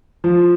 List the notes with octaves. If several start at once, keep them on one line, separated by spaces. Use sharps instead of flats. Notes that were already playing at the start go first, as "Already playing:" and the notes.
F3